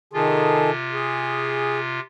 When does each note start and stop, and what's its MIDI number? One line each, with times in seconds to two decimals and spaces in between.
0.13 2.00 48
0.13 0.71 51
0.13 2.00 65
0.13 0.71 68
0.13 0.71 69
0.92 1.79 68